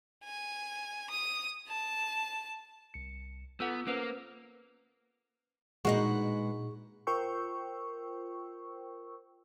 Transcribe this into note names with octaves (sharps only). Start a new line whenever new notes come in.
G#5
D#6
A5
C2 C#7
B3 F4 A4 F#5 E6
A#3 C#4 B4 C5
A#2 G#3 D#4 F#4 G#4 B4 F#5 C#6
F4 A#4 C5 G5 C#6 E6